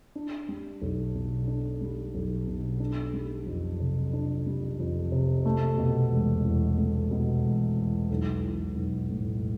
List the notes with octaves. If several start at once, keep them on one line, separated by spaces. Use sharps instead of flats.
D4
G3
B1
B2
D4
G3
B1
B2
D4
G3
F2
C3
D4
G3
F2
C3
A3
B2
E1
E2
A3
B2
E1
E2
B1
E3
B1
A2